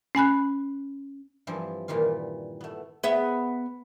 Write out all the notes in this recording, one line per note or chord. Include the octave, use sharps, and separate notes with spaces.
C#4 G#5 B5 F#6
G2 E3 F3 C4
A#2 D#3 E3 G3 F4
A3 B3
B3 G#4 E5